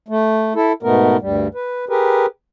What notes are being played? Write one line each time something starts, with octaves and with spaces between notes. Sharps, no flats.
A3
E4 A4
G#2 B2 A3 B3 A#4
D2 G2 G3
B4
G4 G#4 A#4 B4